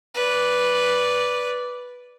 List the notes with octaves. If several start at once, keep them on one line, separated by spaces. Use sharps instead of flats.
B4 D5